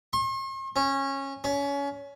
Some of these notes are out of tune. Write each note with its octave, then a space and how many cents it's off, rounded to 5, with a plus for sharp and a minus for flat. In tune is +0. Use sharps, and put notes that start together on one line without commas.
C6 +45
C#4 -20
C#4 +25